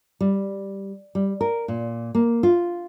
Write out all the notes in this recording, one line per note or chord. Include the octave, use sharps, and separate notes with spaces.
G3
G3
A#4
A#2
A#3
F4